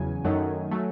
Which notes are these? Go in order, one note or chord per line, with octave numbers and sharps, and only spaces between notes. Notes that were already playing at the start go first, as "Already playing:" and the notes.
Already playing: E2 C#3 F#3 G#5
F#2 D#3 F#3 A3
F#3 A3